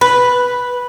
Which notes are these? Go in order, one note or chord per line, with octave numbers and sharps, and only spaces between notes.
B4